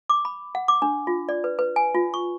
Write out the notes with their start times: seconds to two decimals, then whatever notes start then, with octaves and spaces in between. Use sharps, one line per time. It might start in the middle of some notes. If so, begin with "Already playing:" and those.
0.09 D6
0.25 B5
0.55 F#5
0.68 D6
0.82 D4
1.07 F4
1.29 D5
1.44 B4
1.59 B4
1.76 G#5
1.95 F4
2.14 C#6